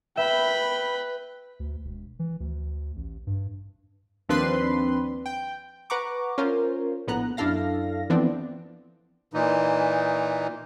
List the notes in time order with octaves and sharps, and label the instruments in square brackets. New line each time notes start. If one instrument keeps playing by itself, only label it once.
[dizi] B4 [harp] E5 [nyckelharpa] G5 B5
[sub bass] D2
E1
E3
D2
A1
G2
[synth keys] D#2 F3 C4 D4 B4 C6
G5
[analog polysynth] B4 F#5 A#5 C#6 D6
C#4 F4 A#4 C5
A#1 A2 B3 A#5 F#6
F#2 D4 E4 A4 F5 A#6
E3 F3 B3 C4 D4
[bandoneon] A#2 E3 D#4